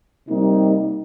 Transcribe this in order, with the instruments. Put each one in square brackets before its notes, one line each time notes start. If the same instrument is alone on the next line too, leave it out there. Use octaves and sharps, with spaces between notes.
[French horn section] C3 G3 A#3 D#4